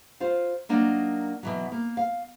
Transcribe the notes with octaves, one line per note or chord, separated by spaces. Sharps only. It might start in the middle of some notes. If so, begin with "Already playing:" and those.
F4 C5 F5
F#3 A#3 D4 D#4
B2 E3 F#3
A#3
F5